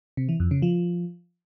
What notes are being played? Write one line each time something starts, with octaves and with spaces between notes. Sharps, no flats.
C3
E3
F2
C#3
F3